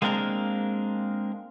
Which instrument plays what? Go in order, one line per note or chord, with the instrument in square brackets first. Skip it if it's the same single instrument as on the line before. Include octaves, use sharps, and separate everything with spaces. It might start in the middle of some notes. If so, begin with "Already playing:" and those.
[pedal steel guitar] G#3 A#3 C4 D4 A#4